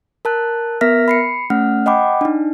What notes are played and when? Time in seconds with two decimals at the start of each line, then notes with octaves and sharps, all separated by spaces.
0.25 A#4 A5 F#6
0.81 B3 A#4 E5 F6 A#6 B6
1.08 B5 C7 C#7
1.50 A3 C#4 F#5 F6
1.86 D#5 F#5 G5 B5 D6
2.21 D4 D#4